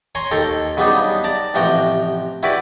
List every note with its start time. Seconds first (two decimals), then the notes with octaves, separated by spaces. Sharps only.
0.15 C#5 G#5 A#5 C6
0.31 D#2 A4 G5 A#5
0.77 C#3 F#3 G3 B3 D4 D#4
1.24 D5 A5 A#5
1.54 A1 C3 F3 F#4 G5 A#5
2.43 E4 F#4 G4 B4 D5